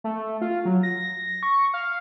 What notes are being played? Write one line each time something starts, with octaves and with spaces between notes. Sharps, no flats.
A3
F4
F#3
A#6
C#6
F5